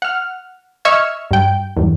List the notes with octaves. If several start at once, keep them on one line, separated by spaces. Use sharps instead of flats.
F#5 F6
D#5 E5 C#6 E6 F6 G#6
G2 G5
E2 G2